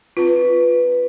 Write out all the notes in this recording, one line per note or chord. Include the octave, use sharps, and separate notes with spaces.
C4 F4 B4